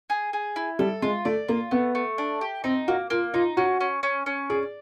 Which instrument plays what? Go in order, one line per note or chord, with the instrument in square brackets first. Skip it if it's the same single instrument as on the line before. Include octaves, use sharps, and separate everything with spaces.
[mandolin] G#4
G#4
E4
[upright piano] G3 [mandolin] A4
[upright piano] G#3 [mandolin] F4
[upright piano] A3 [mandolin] D5
[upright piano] A#3 [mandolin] F4
[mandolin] A3 [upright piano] B3
[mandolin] A3
D4
G4
[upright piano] C4 [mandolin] D#4
[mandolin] A#3 [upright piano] F#4
[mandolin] A#3 [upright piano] F4
[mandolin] D#4 [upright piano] F4
[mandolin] C#4 [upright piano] F#4
[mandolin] C#4
C#4
C#4
[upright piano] G#4 [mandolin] D5